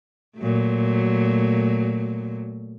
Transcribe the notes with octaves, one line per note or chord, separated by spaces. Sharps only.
A#2 F#3 A3